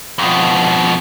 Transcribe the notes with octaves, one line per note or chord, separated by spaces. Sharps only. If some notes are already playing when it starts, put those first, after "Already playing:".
F2 B2